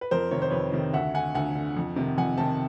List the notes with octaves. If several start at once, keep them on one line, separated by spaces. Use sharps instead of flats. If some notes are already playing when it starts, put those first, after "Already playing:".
B4
F2 A#4 C5
C3 D#3 C#5
C5
F2 B4 C#5
C3 D#3
D2 E5 F#5
D3 F#5 G#5
D2 F#5 G#5
D3
F2
C3 D#3
F2 F#5 G#5
C3 D#3 G5 A5